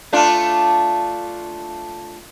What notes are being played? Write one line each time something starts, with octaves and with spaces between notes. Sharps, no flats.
A3 D4 F4